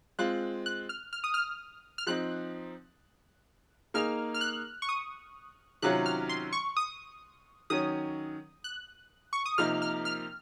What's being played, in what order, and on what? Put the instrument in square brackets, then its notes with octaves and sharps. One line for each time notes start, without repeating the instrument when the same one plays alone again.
[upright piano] G#3 C4 F4 [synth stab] F#6
[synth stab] F#6
F6
F6
D#6
F6
F6
[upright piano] F3 C4 D#4 [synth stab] F#6
[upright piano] A#3 D#4 G#4 [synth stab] F6
[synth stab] F6
F#6
C#6
D#6
[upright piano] C3 D#3 F#3 C#4 F4 [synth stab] F#6
[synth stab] F6
C6
C#6
D#6
[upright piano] D#3 F#3 C#4 [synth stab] D#6
[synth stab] F#6
C#6
D#6
[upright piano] C3 F3 A#3 D#4 A#4 [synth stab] F6
[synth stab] F6
F6